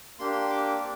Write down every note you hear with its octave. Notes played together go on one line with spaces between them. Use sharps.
A#3 D4 G4 C6
D6
C4